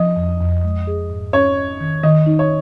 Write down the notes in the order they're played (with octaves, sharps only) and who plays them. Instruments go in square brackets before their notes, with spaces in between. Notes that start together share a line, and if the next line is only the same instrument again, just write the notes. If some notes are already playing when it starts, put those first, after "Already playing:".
Already playing: [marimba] F3 [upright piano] D#5
[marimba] F2
F2
G#3
G#4
G#2
[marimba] C#4 [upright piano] C#5
[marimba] D#5
D#3
[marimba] D#3 [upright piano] D#5
[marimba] D#4
[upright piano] C#5